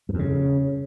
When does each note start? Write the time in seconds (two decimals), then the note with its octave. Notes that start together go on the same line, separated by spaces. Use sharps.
0.09 F#2
0.14 F2
0.19 C#3